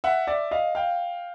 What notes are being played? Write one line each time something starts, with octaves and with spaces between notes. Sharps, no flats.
E5 F#5
D5 E5
D#5 F5
F5 G5